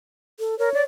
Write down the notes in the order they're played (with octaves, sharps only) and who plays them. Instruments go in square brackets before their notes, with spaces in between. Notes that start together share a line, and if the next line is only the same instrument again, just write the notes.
[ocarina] A4
[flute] A#4 [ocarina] C#5
[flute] D5